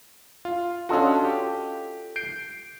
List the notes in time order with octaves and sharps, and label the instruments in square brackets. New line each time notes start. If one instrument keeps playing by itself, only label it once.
[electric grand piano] F4
[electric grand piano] C#4 D4 F#4 [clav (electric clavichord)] F4 A4 D#5
[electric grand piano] G4
G6 C7 D7